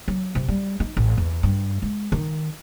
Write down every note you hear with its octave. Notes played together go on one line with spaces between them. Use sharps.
F#3
C3
G3
D#4
A1
E2
G2
G#3
D#3